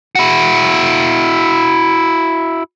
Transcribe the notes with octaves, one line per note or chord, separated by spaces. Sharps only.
E4 F#4